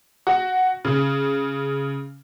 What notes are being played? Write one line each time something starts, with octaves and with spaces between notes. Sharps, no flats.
F#4
C#3